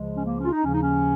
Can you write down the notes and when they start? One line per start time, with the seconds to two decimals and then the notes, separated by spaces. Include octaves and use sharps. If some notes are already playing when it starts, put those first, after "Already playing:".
Already playing: C#2 C#3 F3 G#3
0.17 C#4
0.26 A#3
0.38 C#4
0.45 F4
0.51 D#4
0.63 D#2 C#3 F3 C#4
0.73 D#4
0.82 C#4